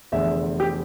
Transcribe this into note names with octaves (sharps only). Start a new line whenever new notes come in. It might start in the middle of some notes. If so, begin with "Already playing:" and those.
F1 E2 D3 E5
G4